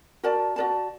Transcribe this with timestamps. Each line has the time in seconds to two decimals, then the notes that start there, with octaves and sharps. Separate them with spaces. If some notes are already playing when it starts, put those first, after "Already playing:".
0.23 F#4 A#4 D5 A5
0.56 F#4 A#4 D5 A5